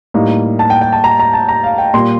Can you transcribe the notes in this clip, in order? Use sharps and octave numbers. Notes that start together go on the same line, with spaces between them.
A2 G3 A#3 D#4
A5
G5
G5
A5
A#5
A#5
A5
A#5
F5
G5
A#2 G3 A#3 C6